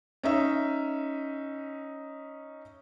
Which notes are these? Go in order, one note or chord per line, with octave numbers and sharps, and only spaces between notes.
C#4 D#4 E5